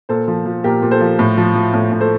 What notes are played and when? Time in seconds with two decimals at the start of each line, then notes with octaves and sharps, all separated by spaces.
0.09 A#2 A4 C5
0.28 F3
0.46 F3
0.64 A#2 G4 A#4
0.82 A#2
0.91 A4 C5
1.00 F3
1.19 A2
1.38 F3
1.56 F3
1.74 A2
1.92 A2
2.01 A4 C5